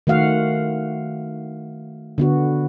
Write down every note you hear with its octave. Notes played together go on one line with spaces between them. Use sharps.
D#3 A3 F#4 F5 F#5
D3 B3 F#4